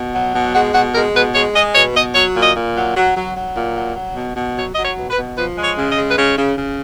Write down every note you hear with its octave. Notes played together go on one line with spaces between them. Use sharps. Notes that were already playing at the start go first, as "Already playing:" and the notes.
Already playing: B2
F#3
B2
G#3 F#4
B2 F#4
G#3 A#4
B2 B4
G#3 C#5
G#3 D#5
B2 C#5
B2 D#5
F#3 C#5
A#2
D#5
A#2
F#3
F#3
F#3
F#3
A#2
F#3
F#3
B2
B2
F#3 C#5
F#3 D#5
C#5
B2
B4
B2
F3 B4
G#3
C#5
C#3
D#5
G#3
B4
C#3 C#5
C#3
C#3